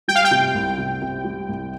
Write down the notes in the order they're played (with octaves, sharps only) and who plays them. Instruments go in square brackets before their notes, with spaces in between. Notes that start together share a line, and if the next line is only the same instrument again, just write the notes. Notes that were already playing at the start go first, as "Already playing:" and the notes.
[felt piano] G3 [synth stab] G5
[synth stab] F5
G5
[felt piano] C3
C2
C3
C3
G3
C2